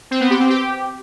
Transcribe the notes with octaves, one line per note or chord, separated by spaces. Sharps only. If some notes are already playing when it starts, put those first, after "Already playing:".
C4
B3
G4
C4
G4